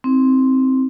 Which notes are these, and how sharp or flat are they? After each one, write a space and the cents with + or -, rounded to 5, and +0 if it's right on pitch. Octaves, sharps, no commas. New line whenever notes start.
C4 +0 D#4 +45